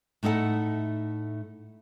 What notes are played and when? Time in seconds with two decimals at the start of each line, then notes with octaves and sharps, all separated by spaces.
0.23 A2 A3 D#4 A4 F#5